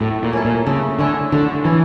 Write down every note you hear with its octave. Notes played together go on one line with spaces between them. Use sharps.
A2 A3
A#2
C#4 E4 A4
A#2
C#3 A3
D3 C#4 E4 A4
D3 A3
E3 C#4 E4 A4